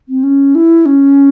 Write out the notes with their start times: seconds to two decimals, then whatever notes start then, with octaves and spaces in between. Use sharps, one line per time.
0.09 C4
0.23 C#4
0.55 E4
0.86 C#4